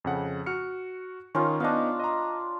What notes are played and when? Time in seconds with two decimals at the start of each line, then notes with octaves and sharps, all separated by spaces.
0.04 F2 C#3 F#5
0.46 F#4 F6 C#7
1.35 D#3 C#4 D#4 F4
1.60 B3 D4 D#4 D#5 F5
2.00 D#5 A#5